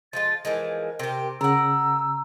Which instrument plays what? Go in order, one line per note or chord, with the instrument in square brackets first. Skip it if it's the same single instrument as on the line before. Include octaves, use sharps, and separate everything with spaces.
[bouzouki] F3 G#3 F4 [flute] A6
[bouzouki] E3 F3 G#3 [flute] A#4
[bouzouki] C3 G4
[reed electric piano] C#3 [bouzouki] A#4 F#5 [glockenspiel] A#5 [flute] E6